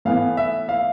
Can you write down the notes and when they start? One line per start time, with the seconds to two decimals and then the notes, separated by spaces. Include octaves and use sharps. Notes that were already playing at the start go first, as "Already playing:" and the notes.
0.05 A2 E3 B3 F5
0.37 E5
0.69 F5